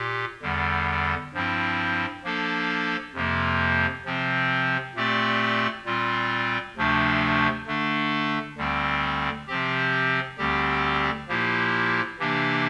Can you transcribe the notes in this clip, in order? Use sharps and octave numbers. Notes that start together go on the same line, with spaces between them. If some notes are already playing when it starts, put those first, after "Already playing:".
Already playing: A#2 G4
E2 D3 G3
G2 F3 C4 E4
F3 A#3 D4 A4
F2 C3 F3 A#3
C3 F3 C4
A#2 A3 C4 G4 D5
A#2 G3 C4 F4
D2 C3 F3 A3 D4
D3 A3 D4
D2 D3 G3 C4
C3 F3 C4 G4
D2 D3 G3 C4 G4
A#2 F3 A#3 E4 G4
C3 E3 A#3 D4 G4